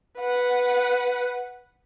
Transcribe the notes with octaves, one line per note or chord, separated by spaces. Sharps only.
B4 F#5